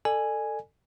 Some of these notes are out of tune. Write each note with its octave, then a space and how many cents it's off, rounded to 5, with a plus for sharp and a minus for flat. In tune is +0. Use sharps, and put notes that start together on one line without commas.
A4 +20 D5 +35 G#5 +0